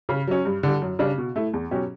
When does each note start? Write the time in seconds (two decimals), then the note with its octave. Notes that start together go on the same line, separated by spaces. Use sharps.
0.09 C#3
0.27 F#3 C#4
0.45 G2
0.63 D3 G3
0.82 F#2
0.99 C#3 G3 D4
1.18 B2
1.36 A3 E4
1.53 E2
1.71 B2 F#3 C#4 G4